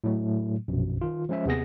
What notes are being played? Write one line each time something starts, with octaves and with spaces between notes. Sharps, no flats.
A2 F#3 A3
A#1 F#2 B2
D#3 F4
F3 G#3 C#4 C5 E5
D#2 C3 B3 G#4 A#6